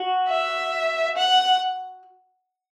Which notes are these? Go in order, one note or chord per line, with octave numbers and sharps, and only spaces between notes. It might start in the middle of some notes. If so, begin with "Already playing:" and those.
Already playing: F#4
E5
F#5